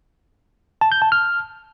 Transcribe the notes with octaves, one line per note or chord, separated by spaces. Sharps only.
A5
G6
A5
F6